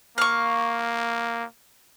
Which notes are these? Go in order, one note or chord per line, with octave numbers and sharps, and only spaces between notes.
A#3 F5 C#6